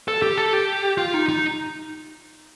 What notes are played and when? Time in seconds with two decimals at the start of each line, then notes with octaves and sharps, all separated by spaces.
0.08 A4
0.22 G4
0.38 A4
0.53 G4
0.98 F4
1.14 D#4
1.29 D#4